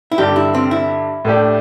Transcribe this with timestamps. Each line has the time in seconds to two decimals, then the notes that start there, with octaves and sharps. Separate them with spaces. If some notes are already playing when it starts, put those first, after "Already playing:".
0.12 E4
0.18 G2 D3 G3 G4
0.36 E4
0.55 C4
0.71 E4
1.25 A2 A3 D4 G4